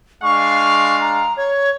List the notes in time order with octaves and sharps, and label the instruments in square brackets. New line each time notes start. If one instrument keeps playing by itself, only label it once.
[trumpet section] G#3 D4 F5 [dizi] C#6
[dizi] A#5
C#5